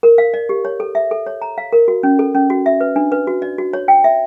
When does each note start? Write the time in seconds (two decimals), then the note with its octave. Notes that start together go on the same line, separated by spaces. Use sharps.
0.03 A#4
0.18 F5
0.34 D5
0.49 G4
0.65 C#5
0.80 A4
0.95 E5
1.11 A4
1.26 C#5
1.42 A#5
1.58 F5
1.73 A#4
1.88 F#4
2.03 C#4
2.19 A4
2.35 C#4
2.50 F#4
2.66 E5
2.81 B4
2.96 D4
3.12 B4
3.27 F#4
3.42 D5
3.58 F#4
3.73 C#5
3.88 G5
4.04 E5